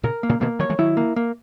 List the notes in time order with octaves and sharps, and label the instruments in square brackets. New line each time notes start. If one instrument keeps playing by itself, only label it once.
[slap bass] A#2 C#3 [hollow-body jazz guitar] A#4
[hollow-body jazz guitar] A#3
[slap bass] A#2 C#3
[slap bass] B2 D#3 [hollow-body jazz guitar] A#3
[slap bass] D#3 F#3 [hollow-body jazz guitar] C#5
[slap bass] E3 G#3
[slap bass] D#3 F#3 [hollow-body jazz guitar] E4
[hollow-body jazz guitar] A#3
A#3